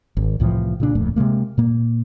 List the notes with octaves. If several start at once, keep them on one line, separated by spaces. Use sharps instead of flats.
G#1
C2 A2 E3 F3
A#2 C#3 D4
D1 F2 A#2 A3
C3 E3 G#3 A#3
A#2 A#3